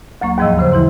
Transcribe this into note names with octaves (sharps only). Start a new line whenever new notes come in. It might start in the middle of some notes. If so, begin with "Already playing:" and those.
D2 F#3 A#3 C#6
D#2 G#2 F3 D#5 E6
G2 C#3 C5
E3 E4 C6